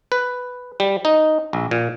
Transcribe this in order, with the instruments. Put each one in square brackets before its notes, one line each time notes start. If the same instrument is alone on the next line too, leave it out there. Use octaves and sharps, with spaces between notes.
[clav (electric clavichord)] B4
G3
D#4
A#1
A#2